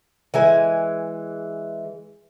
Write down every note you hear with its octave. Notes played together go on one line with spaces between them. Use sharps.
E3 G#3 G#5